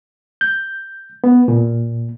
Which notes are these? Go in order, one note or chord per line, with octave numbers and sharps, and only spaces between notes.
G6
B3
A#2